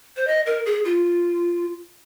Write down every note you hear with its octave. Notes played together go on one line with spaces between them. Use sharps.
C5
D#5
A#4
G#4
F4